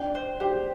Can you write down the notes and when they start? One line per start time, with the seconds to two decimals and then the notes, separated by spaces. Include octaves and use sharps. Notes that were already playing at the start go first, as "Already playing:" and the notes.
Already playing: D4 G5
0.15 C5
0.40 G4 C5